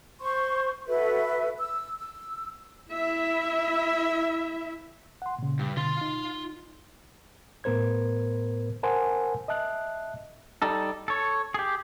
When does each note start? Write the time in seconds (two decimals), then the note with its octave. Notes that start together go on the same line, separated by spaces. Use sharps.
0.19 C5 C6 C#6
0.88 F#4 A4 B4 E5
1.58 E6
1.98 E6
2.90 E4 E5
5.22 F#5 C6
5.39 A#2 C#3
5.59 G2
5.77 B2 D3 F4 C6 A6
6.01 D#4
7.64 A2 B3 A#4 C5 G#6
8.83 A#4 C5 F#5 G#5 A5 C6
9.48 D#5 E5 A5 F#6
10.62 G3 D#4 A4
11.08 A4 C#5
11.54 G4 G#4